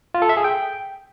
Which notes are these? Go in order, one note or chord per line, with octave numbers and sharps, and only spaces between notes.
F4
A4
E5
G#4
G5